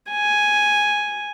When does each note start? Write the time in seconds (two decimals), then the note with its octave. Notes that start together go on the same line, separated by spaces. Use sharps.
0.11 G#5